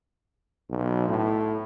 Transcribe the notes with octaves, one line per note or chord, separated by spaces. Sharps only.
B1
A2